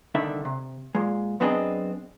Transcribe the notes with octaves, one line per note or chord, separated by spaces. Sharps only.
C2 D3 D#3 D4 E5
C3
A#2 G#3
F#2 B3 C4 D4 G#4 D#5